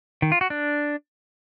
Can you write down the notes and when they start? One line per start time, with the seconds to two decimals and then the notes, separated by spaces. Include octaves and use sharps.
0.22 D#3
0.32 F4
0.41 F#4
0.50 D4